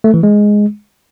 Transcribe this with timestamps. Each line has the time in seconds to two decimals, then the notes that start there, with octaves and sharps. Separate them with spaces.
0.04 A3
0.14 E3
0.23 G#3